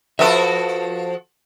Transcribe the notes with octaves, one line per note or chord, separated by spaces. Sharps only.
F3 F#4 A4 B4 E5